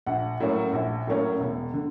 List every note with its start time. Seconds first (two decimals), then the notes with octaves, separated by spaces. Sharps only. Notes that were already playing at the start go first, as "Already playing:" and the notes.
0.06 A#1 F#5
0.40 A2 F#3 A#3 C#4
0.73 A#1
1.07 A2 F#3 A#3 C#4
1.40 E1
1.74 D3